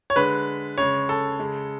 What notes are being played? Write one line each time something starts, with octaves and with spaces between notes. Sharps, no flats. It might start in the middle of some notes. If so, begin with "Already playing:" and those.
C#5
D3 G#3 B4
C#3 G#3 C#5
A4
C#3 G#3